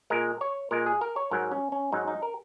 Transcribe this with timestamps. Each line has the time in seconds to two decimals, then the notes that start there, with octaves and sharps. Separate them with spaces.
0.10 A#2 G#3 A#4
0.41 C#5
0.71 A#2 G#3 A#4
0.86 G#4
1.01 A#4
1.16 C#5
1.31 G#2 F#3 A#4
1.52 C#4
1.72 C#4
1.92 G#2 F#3 D#4
2.08 D#4
2.22 A#4